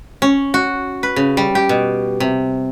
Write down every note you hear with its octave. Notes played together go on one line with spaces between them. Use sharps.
C#4
F#4
B4
C#3
G3
G4
B2
C3